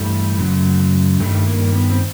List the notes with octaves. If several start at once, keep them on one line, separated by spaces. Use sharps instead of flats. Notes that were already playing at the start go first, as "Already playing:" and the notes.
Already playing: G2 E3 G3 A3
F#2 C#3 F#3
G2 D#3 G3 A3
A#3
B3
C4